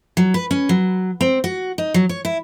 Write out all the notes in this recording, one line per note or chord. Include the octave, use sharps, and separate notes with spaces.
F#3
B4
C#4
F#3
C4
F#4
D#4
F#3
C#5
E4